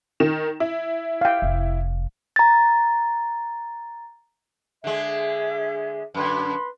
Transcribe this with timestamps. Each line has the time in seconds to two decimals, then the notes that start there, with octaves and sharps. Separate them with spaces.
0.20 D#3 E7
0.60 E4
1.21 F5 G5
1.42 F1
2.36 A#5 A6
4.84 D3 G#3 G#4 E5
6.14 F#2 D3 B4 B5 C6